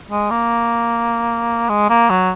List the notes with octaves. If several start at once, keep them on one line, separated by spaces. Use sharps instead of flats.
G#3
A#3
G#3
A#3
F#3